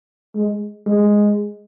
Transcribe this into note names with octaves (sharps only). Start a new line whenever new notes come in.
G#3
G#3